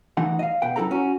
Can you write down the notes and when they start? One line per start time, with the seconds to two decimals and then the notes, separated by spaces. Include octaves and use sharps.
0.17 A2 E3 D#4 F#5
0.39 D#5 F5
0.62 B2 B4 F#5 G5
0.76 F#2 D#3 E4 A4 B4 A#5
0.91 C#4 F#4